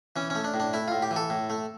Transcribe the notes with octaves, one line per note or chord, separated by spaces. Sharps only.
E3 C#4
A3 C#4
D4
A2
D4
A3 E4
A2 F4
G4
E3
A4
A2
A3